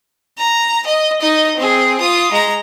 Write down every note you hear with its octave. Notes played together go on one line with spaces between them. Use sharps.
A#5
D#5
D#4 D#5
C4 G#4
F4 D#6
G#3 A#5